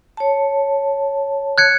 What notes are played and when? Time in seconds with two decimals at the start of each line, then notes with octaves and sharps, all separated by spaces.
0.17 C#5 A5
1.58 F#6 G#6 C#7